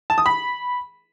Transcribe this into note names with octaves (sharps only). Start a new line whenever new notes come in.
A5
D#6
B5